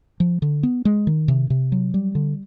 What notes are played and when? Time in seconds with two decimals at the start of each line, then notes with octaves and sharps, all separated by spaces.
0.20 F3
0.42 D3
0.63 B3
0.85 G#3
1.07 D#3
1.28 C3
1.50 C3
1.72 F#3
1.94 G3
2.15 D3